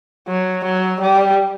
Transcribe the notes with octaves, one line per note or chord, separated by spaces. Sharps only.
F#3
F#3
G3